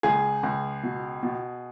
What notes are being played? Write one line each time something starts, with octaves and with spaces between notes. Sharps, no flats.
C#2 G#4
C#2
B2
B2